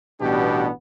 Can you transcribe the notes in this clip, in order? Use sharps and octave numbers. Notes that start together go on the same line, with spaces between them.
A1 B2 G3 B3 D4 G4